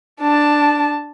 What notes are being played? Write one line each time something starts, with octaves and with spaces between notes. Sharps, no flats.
D4 A5